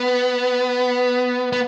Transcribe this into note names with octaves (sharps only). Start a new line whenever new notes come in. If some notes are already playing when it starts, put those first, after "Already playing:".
Already playing: B3
B3